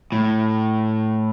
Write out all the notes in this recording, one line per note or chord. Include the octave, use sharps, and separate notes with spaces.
A2